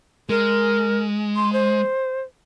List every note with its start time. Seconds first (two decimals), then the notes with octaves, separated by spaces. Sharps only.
0.29 G#3 A#4
1.36 C6
1.53 C5